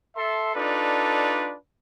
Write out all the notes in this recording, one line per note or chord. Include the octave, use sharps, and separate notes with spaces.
A4 E5 C6
D4 D#4 F4 A4 B4 D5